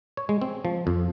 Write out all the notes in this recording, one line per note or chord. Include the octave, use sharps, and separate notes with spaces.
C#5
G#3
C4
F3
F2